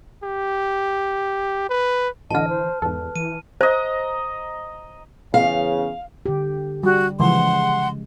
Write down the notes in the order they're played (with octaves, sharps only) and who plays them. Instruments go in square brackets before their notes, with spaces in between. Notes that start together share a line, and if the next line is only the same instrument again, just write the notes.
[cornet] G4
B4
[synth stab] A1 D3 [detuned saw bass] E3 [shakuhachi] D#5 [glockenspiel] A5 F6
[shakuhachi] C5
[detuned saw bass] E2 [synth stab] G#2 A4 [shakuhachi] B4
[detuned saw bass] E3 [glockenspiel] D#7
[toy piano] C5 [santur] D#5 A#5
[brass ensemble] E2 C#3 [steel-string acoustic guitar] F5
[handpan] D3 G4
[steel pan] G3 [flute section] F#4
[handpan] C#3 G#3 [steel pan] E3 F3 [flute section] F#5 C6